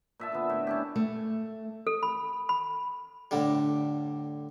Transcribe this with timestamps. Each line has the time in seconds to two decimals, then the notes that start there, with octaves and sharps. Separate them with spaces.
0.20 A#2 E5 A5
0.32 D3 B3
0.50 A2
0.67 C#4 D4 G4
0.96 A3
1.87 A4
2.03 B5
2.49 B5
3.31 A2 D3 G3